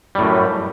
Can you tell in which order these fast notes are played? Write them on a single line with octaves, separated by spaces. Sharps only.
G3 A2 F#2